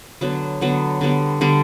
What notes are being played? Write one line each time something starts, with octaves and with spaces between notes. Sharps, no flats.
D3 F#3 B3
D3 F#3 B3
D3 G3 B3
D3 G3 B3